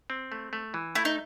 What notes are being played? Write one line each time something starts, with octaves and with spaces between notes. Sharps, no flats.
C4
A3
A3
E3
A3 E4
D#4